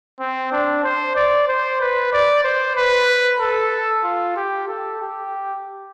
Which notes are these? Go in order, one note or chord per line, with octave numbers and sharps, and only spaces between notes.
C4
D4
C5
D5
C5
B4
D5
C5
B4
A4
F4
G4
A4
G4